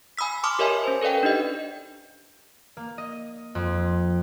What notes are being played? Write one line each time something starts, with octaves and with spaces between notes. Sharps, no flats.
G#5 B5 D#6 E6 B6
A5 C6 D6 D#6 F6
G4 A#4 C#5 D#5 E5 G#5
C#4 C5
A4 B4 D5 F5 G5
D4 D#4 G4 D#5
A#3
D#5
F2